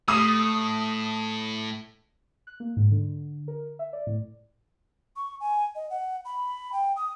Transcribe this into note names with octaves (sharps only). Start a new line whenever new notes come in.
A2 A3 D#6
F#6
A#3
G#2
D3
A#4
E5
D5
A2
C#6
G#5
D#5
F#5
B5
G5
D#6